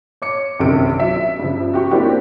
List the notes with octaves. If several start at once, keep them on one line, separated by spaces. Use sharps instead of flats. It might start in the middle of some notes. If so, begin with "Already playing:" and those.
C#5 D6 C#7
A#1 F#2 C3 D#3 D7
F#3 E5
G2 C#3 F3
F#4 G4 C#6
A#3 C4 D4 E4 F#4 G4